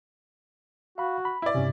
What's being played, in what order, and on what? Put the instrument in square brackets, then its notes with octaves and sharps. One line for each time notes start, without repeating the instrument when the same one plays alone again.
[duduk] F#4 [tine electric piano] F5 B5
[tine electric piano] B5
[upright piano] E4 D5
[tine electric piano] G2 C3 [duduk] C#4